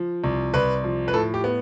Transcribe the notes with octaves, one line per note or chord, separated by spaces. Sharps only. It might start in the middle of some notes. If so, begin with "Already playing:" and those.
Already playing: F3
C2
C2 B4
F3
B4
A2 A4
G4
B3